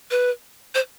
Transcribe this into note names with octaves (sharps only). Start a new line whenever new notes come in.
B4
C5